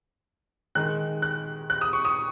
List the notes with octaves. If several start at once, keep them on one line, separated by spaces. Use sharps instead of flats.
D#3 G#3 D#4 F#6
F#6
F#6
D#6
C#6
D#6